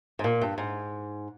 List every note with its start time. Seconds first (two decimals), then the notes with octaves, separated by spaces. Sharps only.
0.19 G#2
0.24 A#2
0.41 G2
0.58 G#2